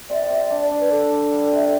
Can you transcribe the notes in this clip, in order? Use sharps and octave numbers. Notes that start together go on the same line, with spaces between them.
C3 D5
C3
D4
D4
B4
D4 A4
D4
G3
C3